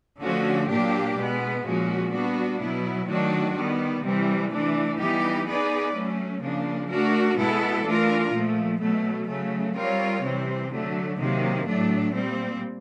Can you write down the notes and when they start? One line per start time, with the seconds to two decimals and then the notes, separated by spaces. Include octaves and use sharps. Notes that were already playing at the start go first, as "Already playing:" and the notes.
0.21 D3 F3 A3 C#4 F#4
0.70 A#2 F#3 A#3 D4 G4
1.17 B2 G#3 B3
1.65 A#2 F3 G#3 C#4 F#4
2.13 G3 B3 D4 F#4
2.61 B2 F#3 B3 E4
3.08 D#3 F#3 A3 D4 F#4
3.57 D#3 G3 B3
4.04 C3 E3 G3
4.51 E3 A3 D4
4.99 E3 G3 B3 D#4 G4
5.47 B3 D#4 G#4 B4 D5
5.95 F#3 A3 C#4
6.42 C#3 F3 A#3 D4
6.90 A3 D4 F#4 A#4
7.38 B2 G#3 B3 E4 A4
7.85 E3 A3 D4 F4 A#4
8.34 A#2 F3 A3
8.81 B2 F#3 A3
9.29 C#3 F#3 A3
9.76 G3 C4 F4 A#4 C#5
10.24 C3 E3 G3 C4
10.72 D3 F#3 A3
11.20 C3 D#3 F#3 A#3
11.68 A2 F#3 A3 D4
12.15 A#2 G3 C4